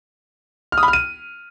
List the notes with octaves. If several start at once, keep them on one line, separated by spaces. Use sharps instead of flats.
F6
D#6
B5
F6
D#7